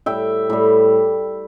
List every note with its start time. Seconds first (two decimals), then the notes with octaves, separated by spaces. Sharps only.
0.06 A2 G3 E5 G5
0.50 A2 G3